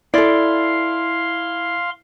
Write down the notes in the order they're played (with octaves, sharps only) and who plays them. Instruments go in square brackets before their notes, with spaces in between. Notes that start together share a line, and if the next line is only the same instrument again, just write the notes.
[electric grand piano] E4 [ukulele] A4 D5 [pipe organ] F5 C6